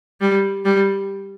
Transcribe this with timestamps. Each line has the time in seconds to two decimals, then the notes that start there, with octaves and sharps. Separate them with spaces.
0.21 G3
0.65 G3